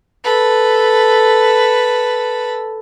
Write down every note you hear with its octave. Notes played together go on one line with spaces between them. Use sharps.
A4 B4